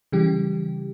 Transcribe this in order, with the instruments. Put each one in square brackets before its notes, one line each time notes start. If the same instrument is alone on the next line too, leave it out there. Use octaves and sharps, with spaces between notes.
[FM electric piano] C#3 E3 G3 G4